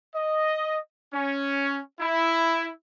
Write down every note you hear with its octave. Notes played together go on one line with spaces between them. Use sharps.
D#5
C#4
E4